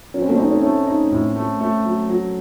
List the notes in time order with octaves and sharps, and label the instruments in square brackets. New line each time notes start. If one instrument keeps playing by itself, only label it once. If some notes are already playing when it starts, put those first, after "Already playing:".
[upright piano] F#3 [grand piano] C#4
[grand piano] C4
A3
[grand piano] C4 [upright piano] D#4
[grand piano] C#4
[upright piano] A3
D#4
A2
A3
A3
F#3
F#3